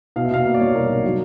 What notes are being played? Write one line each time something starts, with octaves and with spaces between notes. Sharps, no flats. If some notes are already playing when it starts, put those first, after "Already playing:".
B2 F5
E5
B2 F5
A#3
D5
G3 C#5
B2 A#4
B1
F#3